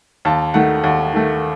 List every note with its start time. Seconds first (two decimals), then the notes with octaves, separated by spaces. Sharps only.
0.25 D#2 A5
0.54 D#3 A3 F#5
0.84 D#2 F#5
1.13 D#3 A3